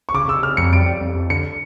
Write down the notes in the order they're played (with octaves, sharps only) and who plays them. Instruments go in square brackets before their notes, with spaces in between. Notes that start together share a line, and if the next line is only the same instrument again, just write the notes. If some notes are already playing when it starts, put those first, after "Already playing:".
[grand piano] C#6
[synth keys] C#3 [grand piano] D6
[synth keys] C#3 [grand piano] E6
[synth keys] C#3 [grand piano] F6
[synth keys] F2 [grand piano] C#7
[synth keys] G3 [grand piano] D7
[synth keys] G3
F2
F2
[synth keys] D3 [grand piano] C#7